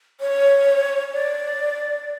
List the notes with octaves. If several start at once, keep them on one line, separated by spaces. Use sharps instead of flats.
C#5
D5